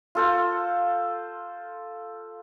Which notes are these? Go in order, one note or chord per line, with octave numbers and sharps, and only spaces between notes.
F4 A4 C5